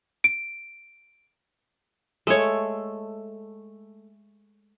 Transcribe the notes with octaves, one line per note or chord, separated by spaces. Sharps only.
D7
G#3 A3 C#5